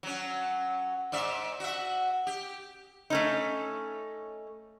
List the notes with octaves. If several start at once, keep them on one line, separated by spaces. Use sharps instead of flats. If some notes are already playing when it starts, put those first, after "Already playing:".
F#3 C#4
G#2 D5 E5
F#4 E5
G4
A3 C#4 D#4